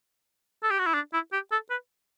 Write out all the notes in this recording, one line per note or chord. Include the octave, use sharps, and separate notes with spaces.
A4
G4
F#4
E4
D4
E4
G4
A4
B4